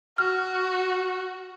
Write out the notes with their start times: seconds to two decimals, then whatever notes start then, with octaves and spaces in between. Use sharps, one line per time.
0.18 F#4 F6